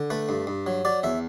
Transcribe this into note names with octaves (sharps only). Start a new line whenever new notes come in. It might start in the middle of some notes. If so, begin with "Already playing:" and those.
Already playing: D3
A3 B4
G2
G2
F#3
F#3 D5
E2 E5